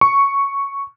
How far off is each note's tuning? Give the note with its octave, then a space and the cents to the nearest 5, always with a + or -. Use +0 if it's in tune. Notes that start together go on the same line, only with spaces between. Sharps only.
C#6 +0